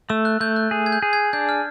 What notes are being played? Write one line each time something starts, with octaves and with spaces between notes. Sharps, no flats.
A3 E6
F#6
A3 G6
F#6
G#4
G#6
G6
G#4
G#6
D4 G6
F6